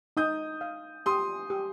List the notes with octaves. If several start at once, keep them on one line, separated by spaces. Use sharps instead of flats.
D#4 D#6 G6
F5
G4 C6 D#6
G4